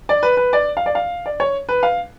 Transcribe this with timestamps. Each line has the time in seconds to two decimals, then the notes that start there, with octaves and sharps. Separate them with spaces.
0.09 D5
0.23 B4
0.37 B4
0.53 D5
0.77 F5
0.86 D5
0.95 F5
1.26 D5
1.40 C#5
1.69 B4
1.83 F5